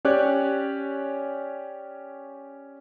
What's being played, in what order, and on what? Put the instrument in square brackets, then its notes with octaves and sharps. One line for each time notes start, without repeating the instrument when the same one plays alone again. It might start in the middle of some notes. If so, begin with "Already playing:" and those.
[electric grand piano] C#4 G4 C#5 D5 F#6